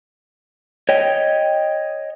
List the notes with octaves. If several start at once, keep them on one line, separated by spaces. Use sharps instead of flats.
C#5 D#5 G5